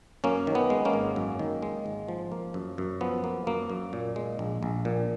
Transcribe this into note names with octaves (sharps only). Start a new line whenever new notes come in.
F#2 A#3 C#4
D#3
B3
G#3
A#3 C#4
G#1
F#2
D#3
G#3
G#1
F3
A#3
F#2
F#2
F3 B3
A#3
F#2 A#3
F#2
A#2
G#3
A#1
A#1
A#2